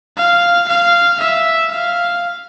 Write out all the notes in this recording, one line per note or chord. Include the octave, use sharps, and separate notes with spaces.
F5
F5
E5
F5